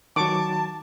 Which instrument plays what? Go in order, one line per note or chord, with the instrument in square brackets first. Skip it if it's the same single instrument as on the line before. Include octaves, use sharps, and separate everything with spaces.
[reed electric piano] D#3 F#3 [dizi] A5 [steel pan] C#6 D6